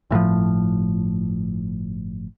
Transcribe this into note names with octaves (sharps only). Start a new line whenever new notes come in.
G1 A2 D3 F3